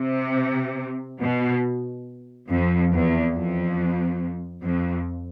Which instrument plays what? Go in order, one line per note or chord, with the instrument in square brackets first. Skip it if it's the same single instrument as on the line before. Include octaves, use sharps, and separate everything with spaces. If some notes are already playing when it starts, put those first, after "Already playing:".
Already playing: [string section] C3
B2
F2
E2
F2
F2